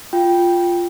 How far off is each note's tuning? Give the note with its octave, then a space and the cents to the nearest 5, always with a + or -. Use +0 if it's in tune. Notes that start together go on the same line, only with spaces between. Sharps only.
F4 +0 G5 +0